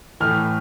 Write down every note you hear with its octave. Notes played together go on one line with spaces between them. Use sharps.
A2 E3 A3 F6